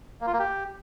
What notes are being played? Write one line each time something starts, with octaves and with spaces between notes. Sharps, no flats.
A#3
F4
A#3
G4